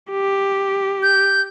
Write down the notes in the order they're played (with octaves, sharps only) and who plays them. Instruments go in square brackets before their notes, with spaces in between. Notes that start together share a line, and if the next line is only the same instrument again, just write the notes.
[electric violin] G4
[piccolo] G6